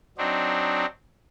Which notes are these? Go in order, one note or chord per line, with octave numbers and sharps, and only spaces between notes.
F#3 C4 D4 D#4